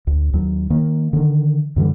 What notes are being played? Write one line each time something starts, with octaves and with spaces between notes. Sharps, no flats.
D2
D#2 F#3
D#3 A#3
D3 D#3
F#2 D3 E3 G3